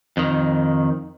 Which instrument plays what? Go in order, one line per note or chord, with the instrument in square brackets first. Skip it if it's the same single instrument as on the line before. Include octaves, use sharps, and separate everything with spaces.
[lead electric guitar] F2 D#3